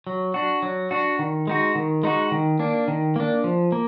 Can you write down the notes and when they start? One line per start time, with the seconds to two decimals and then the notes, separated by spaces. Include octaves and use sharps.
0.07 F#3
0.34 D4 F#4
0.62 F#3
0.91 D4 F#4
1.19 D#3
1.47 G#3 D#4 F#4
1.75 D#3
2.03 G#3 D#4 F#4
2.32 D#3
2.59 A#3 D4
2.88 D#3
3.16 A#3 D4
3.44 F3
3.72 A#3